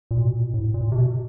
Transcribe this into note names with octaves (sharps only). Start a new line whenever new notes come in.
A#2
B2
A#2
A2
A#2
C3
B2